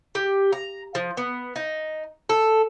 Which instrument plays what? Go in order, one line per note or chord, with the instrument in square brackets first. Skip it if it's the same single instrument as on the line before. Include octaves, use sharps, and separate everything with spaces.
[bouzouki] G4
A#5
F3
B3
D#4
A4